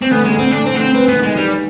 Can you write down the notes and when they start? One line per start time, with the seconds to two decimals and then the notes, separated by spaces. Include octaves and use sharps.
0.02 C4
0.11 D2 B3
0.25 G#3
0.31 D2
0.39 C4
0.52 D2 D4
0.67 C4
0.73 D2 D4
0.81 C4
0.95 C4 B4
1.08 B3
1.16 D#3
1.23 G#3
1.36 D#3 G3